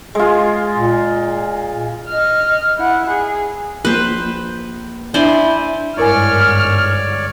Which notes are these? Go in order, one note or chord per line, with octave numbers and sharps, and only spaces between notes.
G#3 F4 G#4
A#2
D#5 F6
E4 F#5
G#4
A#1 A#3 B4 C5
D4 E4 C5 D5 G#5
G1 G#2 E4 A#4 C#5 D5 G#5 F6